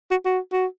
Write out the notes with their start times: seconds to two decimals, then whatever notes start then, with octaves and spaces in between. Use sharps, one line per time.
0.11 F#4
0.25 F#4
0.52 F#4